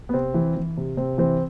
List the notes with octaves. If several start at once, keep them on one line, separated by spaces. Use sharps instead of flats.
B3
C3 C4
E3
E3
C3
C3 C4
E3 C4